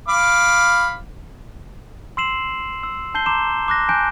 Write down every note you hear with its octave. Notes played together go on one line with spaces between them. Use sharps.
F5 B5 D6
C6 E6 C7 E7 F#7
E6
A5 G6 C7 G7
A#5 C6 D6 E7
D6 F#6 A#6
G#5 A5 F#6 G6 D7